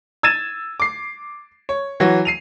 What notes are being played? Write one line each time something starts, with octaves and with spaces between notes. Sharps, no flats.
E6 G#6 A6 D#7 E7
D6 C7
C#5
E3 F#3 F#4
C7 D#7 F7